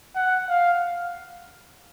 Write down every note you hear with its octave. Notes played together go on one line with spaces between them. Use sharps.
F#5
F5